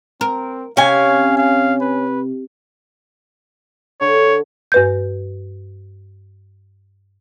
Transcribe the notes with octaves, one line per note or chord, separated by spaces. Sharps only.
C4 A#4
C3 C#4 F5 G#5
F5
B4
D3 C#5
G2 B4 G6